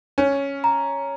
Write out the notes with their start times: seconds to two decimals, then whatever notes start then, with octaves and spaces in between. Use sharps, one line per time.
0.18 C#4 C#5
0.64 A#5